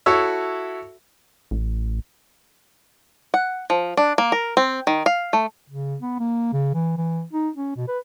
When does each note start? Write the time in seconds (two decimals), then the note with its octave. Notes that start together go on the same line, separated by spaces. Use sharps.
0.06 E4 F#4 A4 C#5 E5
1.51 A1
3.34 F#5
3.70 F3
3.97 D4
4.18 A#3
4.32 A#4
4.57 C4
4.87 D#3
5.06 F5
5.33 A3
5.70 C#3
6.01 B3
6.20 A#3
6.53 C#3
6.74 E3
6.98 E3
7.33 D#4
7.55 C#4
7.76 B2
7.88 B4